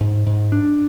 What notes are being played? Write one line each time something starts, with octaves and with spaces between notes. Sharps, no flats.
G#2
G#2
D4